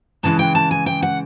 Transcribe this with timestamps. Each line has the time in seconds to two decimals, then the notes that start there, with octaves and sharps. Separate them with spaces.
0.23 F#2 C#3 E3 G#3 A5
0.39 G5
0.55 A5
0.71 G#5
0.86 G5
1.02 F#5